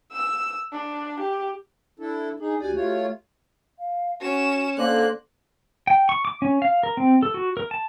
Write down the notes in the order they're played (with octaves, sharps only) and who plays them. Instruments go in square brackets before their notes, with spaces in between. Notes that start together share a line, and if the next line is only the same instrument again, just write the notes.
[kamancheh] E6
D4
G4
[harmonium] D4 E4 A4
[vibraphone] D4 [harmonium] D#4 G#4
[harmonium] D2 D5 G#5 [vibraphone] F#4 G4
[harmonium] A3 F4 C#5
[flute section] F5
[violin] C#4 E7 [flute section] F#4
[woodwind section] D3 A#3 [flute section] C5 D5 C6 [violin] F#6
[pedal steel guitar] G5
C#6
D6
C#4
F5
A#4
C4
A4
F#4
A#4
A5